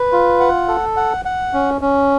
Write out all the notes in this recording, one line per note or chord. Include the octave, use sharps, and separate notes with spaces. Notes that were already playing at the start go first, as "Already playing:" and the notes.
Already playing: B4
F4
F#5
A4
F#5
F#5
C#4
C#4